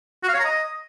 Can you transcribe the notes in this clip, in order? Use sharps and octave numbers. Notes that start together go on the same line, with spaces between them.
F#4
F5
C#5
A#5
D#5